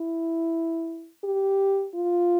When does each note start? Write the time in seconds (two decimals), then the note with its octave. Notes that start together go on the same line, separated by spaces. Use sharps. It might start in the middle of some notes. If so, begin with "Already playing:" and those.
Already playing: E4
1.24 G4
1.95 F4